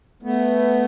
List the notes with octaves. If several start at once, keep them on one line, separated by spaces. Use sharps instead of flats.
A3 B3